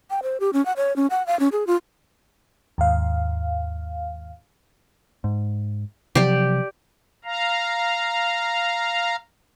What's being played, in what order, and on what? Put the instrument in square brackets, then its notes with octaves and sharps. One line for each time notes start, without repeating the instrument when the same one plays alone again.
[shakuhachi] G5
C5
G4
C#4
F#5
C#5
C#4
F#5
F5
C#4
G#4
F4
[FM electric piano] D#2 G#2 F5
[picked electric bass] G#2
[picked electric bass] C3 F3 F#3 [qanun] G4 D5
[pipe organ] F5 A#5